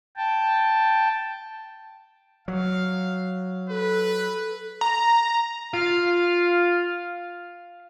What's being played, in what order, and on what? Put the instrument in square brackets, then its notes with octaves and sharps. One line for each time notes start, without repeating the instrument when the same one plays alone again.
[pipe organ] G5 A5
[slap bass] F#3 [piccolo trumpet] F5
[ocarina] A4 [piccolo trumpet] B4
[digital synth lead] A#5
[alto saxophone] F4 [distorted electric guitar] F5